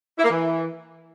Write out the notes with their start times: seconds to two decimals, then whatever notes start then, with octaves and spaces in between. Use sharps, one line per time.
0.18 E4
0.24 A#3
0.30 E3